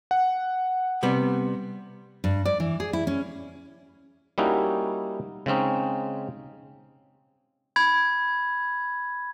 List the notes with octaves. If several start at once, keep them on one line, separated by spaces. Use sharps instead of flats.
F#5
C3 G3 B3
G2
D5
E3
G#4
E4
C#4
G3 A#3 C#4 D#4 E4 F#4
C#3 G#3 C4 C#4 D#4
B5 G#6